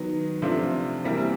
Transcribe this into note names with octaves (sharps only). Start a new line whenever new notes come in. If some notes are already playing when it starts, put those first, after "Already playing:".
Already playing: D#3 F#3 B3
C3 F3 A3 D4 F4
C3 E3 G3 A#3